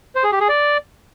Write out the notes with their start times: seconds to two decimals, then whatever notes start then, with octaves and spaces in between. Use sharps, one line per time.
0.15 C5
0.24 G#4
0.32 G4
0.41 G#4
0.49 D5